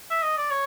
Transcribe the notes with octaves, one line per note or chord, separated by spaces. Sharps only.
E5
D#5
D5
C#5